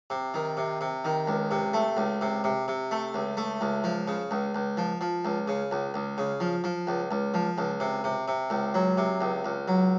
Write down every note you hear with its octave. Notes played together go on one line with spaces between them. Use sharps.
C3
D#3
C3
C3
D#3
C#2
C3
A3
C#2
C3
C3
C3
A3
C#2
A3
C#2
F3
C#3
C#2
C#2
F3
F3
C#2
C#3
C#2
C#2
C#3
F3
F3
C#2
C#2
F3
C#2
C3
C3
C3
C#2
F#3
C3
C#2
C#2
F#3